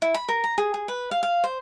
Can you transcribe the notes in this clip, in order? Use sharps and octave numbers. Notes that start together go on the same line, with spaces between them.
E4
B5
A#4
A#5
G#4
G#4
B4
F5
F5
C5